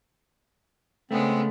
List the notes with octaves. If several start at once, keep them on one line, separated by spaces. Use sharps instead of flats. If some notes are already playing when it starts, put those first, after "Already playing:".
C#3 G#3 A3 B3 C4